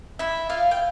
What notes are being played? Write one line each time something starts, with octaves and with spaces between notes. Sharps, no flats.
E4 E5
F4 F5
G5